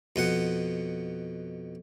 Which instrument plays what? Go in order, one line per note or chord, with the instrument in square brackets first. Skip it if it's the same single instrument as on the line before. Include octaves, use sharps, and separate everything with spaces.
[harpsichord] F2 B2 F#5